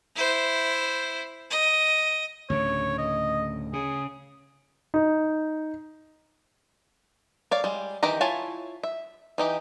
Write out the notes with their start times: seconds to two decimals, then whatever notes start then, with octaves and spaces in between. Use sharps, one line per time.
0.15 E4 C5
1.50 D#5
2.50 D2 A2 C#3 C#5
2.98 D#5
3.73 C#3 G#4
4.94 D#4
7.51 C#5 D5 F5
7.64 G3 G#3
8.03 D#3 E3 G4 A#5
8.21 E4 F4 C#5 G#5 A5
8.83 E5
9.38 E3 D#4 G4